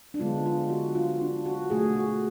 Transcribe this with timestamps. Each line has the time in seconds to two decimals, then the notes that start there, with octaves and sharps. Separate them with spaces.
0.14 D4
0.20 D3 G#3 B3 F4
0.46 F4
0.70 F#4
0.95 F4
1.21 D4
1.46 F#4
1.70 B2 A3 G#4
1.96 F#4